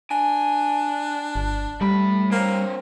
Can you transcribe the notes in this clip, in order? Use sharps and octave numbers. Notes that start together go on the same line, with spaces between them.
D4 G#5
G1
G3 A3 B5
A#3 C4 C#5